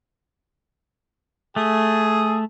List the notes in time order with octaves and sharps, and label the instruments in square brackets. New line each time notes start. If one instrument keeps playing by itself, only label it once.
[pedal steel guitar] A3 [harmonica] G#4